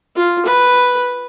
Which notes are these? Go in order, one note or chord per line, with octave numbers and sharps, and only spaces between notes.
F4
B4